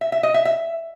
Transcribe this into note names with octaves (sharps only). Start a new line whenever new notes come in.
E5
E5
D#5
E5
E5